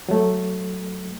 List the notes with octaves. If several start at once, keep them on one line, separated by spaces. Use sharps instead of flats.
F#3 A3